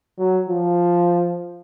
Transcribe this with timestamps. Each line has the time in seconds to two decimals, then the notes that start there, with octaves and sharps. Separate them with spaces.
0.18 F#3
0.49 F3